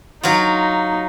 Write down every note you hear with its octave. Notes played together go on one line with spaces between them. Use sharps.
F#3 D#4 F4